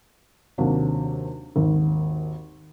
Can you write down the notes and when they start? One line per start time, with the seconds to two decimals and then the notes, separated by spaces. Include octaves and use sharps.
0.58 D#2 C3 F#3 A#3 D4
1.56 G#1 D#2